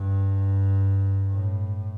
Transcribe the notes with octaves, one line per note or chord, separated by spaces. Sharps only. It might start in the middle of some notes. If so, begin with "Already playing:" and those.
Already playing: G2
A2